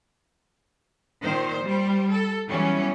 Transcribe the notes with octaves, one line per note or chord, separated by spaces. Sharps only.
A#2 D#3 C5
G3 C5
A4
E3 F#3 G3 B3 C#4